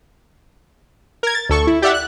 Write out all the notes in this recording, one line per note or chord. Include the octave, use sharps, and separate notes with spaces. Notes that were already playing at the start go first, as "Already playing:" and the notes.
A#4 G#6
A6
D2 A4 C#6
E4
G4 D5 E5 F#5
F#6